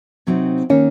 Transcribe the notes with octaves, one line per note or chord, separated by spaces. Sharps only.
C3 F#3 C4 D#4
D#3 A#3 C#4